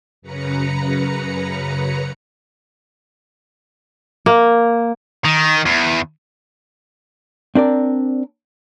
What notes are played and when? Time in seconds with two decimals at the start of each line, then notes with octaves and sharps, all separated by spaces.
0.22 F#2 C#3 B4 A#5 C#7
4.26 A#3
5.25 D#3
5.66 E2
7.55 C4 D4 A#4 D5